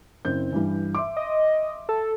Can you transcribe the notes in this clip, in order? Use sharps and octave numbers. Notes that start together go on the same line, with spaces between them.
F#1 C4 G6
G2 E3
E5 C6 D6
D#5
A4